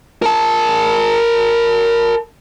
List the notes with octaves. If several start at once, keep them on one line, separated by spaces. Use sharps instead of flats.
A#4 A5